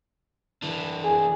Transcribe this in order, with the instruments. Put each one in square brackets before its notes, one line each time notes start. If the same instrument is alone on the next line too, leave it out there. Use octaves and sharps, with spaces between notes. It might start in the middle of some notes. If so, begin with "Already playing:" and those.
[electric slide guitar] E3 D4
[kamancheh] G#4